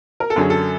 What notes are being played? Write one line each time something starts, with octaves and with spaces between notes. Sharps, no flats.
A#4
A4
F#2 D3 F#3 G#4
A4